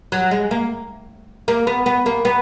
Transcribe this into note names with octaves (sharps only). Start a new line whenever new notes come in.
F#3
G#3
A#3
A#3
B3
B3
A#3
B3